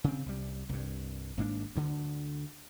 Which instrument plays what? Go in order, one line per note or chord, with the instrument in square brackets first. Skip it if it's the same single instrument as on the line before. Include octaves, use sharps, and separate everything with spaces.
[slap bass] C#3 C4
C2 G3
C2 G2
G#1 G#2 A#3 D4
D2 D3